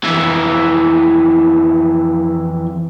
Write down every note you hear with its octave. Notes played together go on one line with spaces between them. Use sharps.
F2 E3